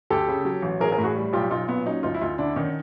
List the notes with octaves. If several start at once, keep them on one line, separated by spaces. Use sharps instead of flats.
D2 G4 A4
C#3
F#3
A1
A1 G#4 A#4
G#4 A#4
A2
F#4 G#4
G3
B1 F4 G4
B1 D#4 F4
A#2 B3
F#3 C#4 D#4
D2 D#4 F4
E4
D2 D#4 F4
D3 D4 E4
D#3 C#4 D#4